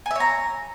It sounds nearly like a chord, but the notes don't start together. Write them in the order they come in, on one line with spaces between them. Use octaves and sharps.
G#5 E5 C#5 A#5